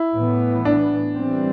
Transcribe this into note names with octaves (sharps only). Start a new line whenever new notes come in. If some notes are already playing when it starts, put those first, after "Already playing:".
Already playing: E4
A2 E3 B3
D4
E3 G3 C4